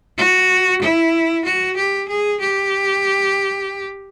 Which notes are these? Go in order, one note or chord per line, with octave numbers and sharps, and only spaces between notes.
F#4
E4
F#4
G4
G#4
G4